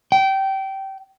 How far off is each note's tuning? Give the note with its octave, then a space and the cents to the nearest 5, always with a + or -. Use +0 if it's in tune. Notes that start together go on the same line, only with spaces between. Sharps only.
G5 -20